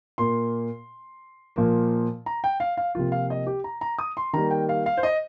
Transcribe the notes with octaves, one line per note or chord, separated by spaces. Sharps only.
A#2 A#3 C6
A#2 F3 A#3
A#5
G5
F5
F5
C3 F3 A#3 F4
F5
D#5
G4
A#5
A#5
D#6
C6
D#3 G3 A#3 A#5
G5
F5
F5
C5
D#5